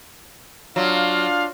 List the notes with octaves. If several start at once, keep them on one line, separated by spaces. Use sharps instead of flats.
F#3 D4 F4 F5